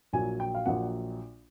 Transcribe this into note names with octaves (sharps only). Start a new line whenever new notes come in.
A#1 A#2 F#3 A#3 G#5
G5
F5
A#1 A#2 F#3 A#3 F#5